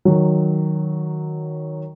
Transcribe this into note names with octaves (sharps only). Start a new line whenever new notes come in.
D#3 F#3